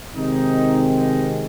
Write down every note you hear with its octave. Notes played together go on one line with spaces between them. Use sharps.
C3 D#3 G#3 C4 D#4
D#4